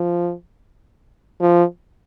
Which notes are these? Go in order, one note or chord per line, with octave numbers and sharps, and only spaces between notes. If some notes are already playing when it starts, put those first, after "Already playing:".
Already playing: F3
F3